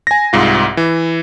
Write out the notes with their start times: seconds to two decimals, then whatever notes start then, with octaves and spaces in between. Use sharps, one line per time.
0.07 G#5 A#6
0.33 C2 G#2 F4
0.77 E3